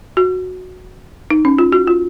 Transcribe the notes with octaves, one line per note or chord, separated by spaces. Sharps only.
F#4
D#4
C#4
F4
F#4
F4